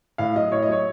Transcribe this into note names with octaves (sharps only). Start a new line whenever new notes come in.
A2 F5
F#3 D#5
A2 C#5
D#5
F#3 C#5